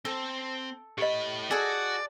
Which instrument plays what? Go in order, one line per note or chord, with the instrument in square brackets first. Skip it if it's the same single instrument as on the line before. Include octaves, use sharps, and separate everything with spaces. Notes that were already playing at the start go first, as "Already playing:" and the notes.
[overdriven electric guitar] C4 [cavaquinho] A4
[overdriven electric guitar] A2 B5 [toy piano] G4 D#5
[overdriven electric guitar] F#4 [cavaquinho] G#4 A4 [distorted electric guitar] D5